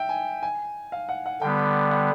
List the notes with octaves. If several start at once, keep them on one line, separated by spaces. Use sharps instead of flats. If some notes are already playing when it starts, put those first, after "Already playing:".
Already playing: E5 G5
G#5
G#5
F5
F#5
F#5
D3 G3 B3 G5
F#5